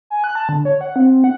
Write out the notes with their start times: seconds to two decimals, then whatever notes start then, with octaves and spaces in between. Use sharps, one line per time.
0.10 G#5
0.24 F#6
0.35 A5
0.49 D3
0.65 C#5
0.81 F#5
0.96 C4
1.09 C4
1.24 F#5